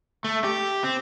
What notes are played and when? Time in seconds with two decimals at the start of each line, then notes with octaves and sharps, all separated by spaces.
0.24 A3
0.44 G4
0.84 C4